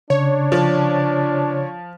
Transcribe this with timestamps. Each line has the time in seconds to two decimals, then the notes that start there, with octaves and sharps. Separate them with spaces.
0.10 C#3 D4 C#5
0.52 F3